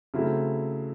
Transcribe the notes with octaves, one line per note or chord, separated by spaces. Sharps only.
C#3 F#3 A3 C4 E4